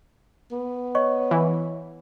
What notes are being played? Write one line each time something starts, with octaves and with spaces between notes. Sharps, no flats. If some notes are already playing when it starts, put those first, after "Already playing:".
B3
C#5 D#5 C#6
E3